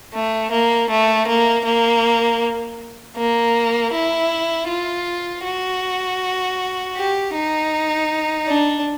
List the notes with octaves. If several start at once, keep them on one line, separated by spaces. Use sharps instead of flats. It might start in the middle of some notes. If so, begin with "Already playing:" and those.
A3
A#3
A3
A#3
A#3
A#3
E4
F4
F#4
G4
D#4
D4